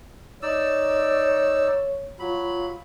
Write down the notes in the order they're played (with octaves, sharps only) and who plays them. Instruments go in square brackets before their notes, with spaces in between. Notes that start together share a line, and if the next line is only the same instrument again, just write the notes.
[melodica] D#4 D5 E6 [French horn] C#5
[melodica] F#3 B5 [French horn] F4